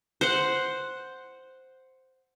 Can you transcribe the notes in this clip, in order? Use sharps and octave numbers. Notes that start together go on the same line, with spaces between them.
C5 F#5